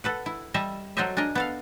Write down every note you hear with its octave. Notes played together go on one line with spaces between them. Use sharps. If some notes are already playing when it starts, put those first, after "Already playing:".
A4 B4 F#5
E4
G3 D#5 E5 A5
F#3 F#4 A4 C5 D#5 E5
D4 G#4 A#4 D#5
B3 A4 F5